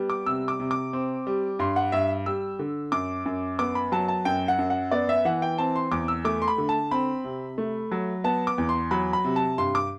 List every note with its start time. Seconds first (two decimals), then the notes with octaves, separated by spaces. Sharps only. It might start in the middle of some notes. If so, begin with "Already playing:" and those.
Already playing: G3 B3
0.10 D6
0.26 C3 E6
0.48 D6
0.60 C3
0.71 D6
0.93 C4
1.27 G3
1.59 G2 C6
1.76 F#5
1.92 G2 E5
2.26 G3 E6
2.59 D3
2.92 F#2 D6
3.26 F#2
3.59 B3 D6
3.75 B5
3.92 F#3 A5
4.08 A5
4.25 F#2 G5
4.48 F#5
4.59 F#2
4.70 F#5
4.91 B3 D5
5.09 E5
5.25 E3 F#5
5.42 G5
5.58 C4 A5
5.76 C6
5.92 E2 D6
6.08 E6
6.25 A3 D6
6.42 C6
6.48 B5
6.58 D3
6.69 A5
6.91 C4 B5
7.24 C3
7.58 A3
7.92 F#3
8.24 B3 A5
8.47 D6
8.58 E2
8.69 C6
8.91 F#3 B5
9.13 B5
9.24 C3
9.36 A5
9.58 G2 C6
9.75 D6